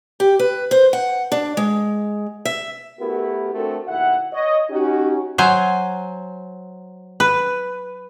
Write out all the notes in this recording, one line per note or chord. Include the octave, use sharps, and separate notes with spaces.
G4
B4
C5
F#5
D4
G#3
E5
A3 B3 E4 F#4 G4 A#4
A3 C4 D4 F#4 A4 A#4
D#2 B2 E4 E5 F#5
C#5 D#5
C#4 D#4 F#4 G4
F#3 C5 G#5
B4